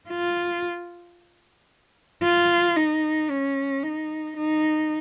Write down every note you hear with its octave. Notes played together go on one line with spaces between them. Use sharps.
F4
F4
D#4
C#4
D#4
D#4